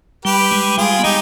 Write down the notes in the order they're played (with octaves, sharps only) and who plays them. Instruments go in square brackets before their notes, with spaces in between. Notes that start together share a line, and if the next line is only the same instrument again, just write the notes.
[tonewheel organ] G3 [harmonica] G4 B4
[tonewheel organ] G#3
[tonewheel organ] G3 [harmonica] F4 G#4
[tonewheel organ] B3
[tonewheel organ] G#3 [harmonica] D#4 G4